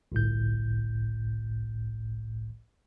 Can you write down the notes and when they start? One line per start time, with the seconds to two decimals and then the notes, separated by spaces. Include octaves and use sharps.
0.12 G1 C2 A2 G6